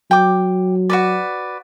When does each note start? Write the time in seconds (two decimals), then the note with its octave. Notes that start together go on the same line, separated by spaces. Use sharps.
0.11 F#3 G5 D6
0.90 F#4 B4 D5